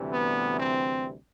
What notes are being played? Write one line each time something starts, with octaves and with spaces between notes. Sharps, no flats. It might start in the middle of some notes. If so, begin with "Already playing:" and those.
Already playing: D2 C3 E3 G3
B3
C4